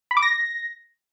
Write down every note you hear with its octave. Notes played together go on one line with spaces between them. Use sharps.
B5
D6
A#6